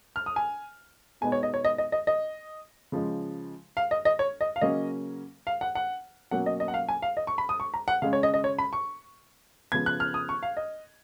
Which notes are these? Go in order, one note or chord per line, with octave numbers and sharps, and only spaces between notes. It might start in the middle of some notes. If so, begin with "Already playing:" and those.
F6
D#6
G#5
B2 G#3 B3 D#4 G#5
C#5
D#5
C#5
D#5
D#5
D#5
D#5
C#3 F3 G#3
F5
D#5
D#5
C#5
D#5
F5
C#3 F#3 A#3 C#4 D#5
F5
F#5
F#5
B2 F#3 A#3 C#4 F#5
D#5
D#5
F#5
F5
G#5
F5
D#5
C#6
B5
D#6
C#6
A#5
F#5
C#3 G#3 C#4 F5
C#5
D#5
D#5
C#5
B5
C#6
C#3 F3 B3 G#6
F#6
F6
D#6
C#6
F5
D#5